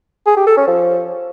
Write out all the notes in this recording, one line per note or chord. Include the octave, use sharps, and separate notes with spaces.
G#4
G4
A4
C#4
F3